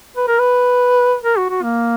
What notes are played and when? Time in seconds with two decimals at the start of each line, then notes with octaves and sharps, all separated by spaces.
0.17 B4
0.28 A#4
0.39 B4
1.24 A#4
1.38 F#4
1.50 F#4
1.63 A#3